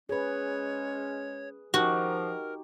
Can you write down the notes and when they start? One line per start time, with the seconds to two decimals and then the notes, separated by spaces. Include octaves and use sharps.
0.09 G#3 C#4 G#4 B4 C#5
1.74 F3 D#4 F#4 G4 A#4